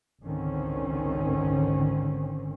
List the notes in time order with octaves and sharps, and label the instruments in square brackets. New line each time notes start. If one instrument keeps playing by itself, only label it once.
[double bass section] G#1 C#2 D3 D#3 C4 C#4